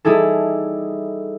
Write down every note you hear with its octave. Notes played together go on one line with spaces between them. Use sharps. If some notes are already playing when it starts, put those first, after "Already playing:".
G3 D#4 E4 G#4 A4